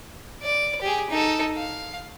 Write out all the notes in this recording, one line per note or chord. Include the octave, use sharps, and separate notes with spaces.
D5
G4 G#4
D#4 A4
F5